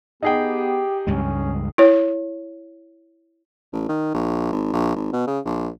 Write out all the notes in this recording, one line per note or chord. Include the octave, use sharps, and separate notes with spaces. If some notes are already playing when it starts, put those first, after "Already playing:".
B3 D#4 G4 G#4 G5
C#2 G2 G#3 C#4
E4 C#5
A1
D#3
A#1
G#1
A#1
G#1
B2
C#3
A#1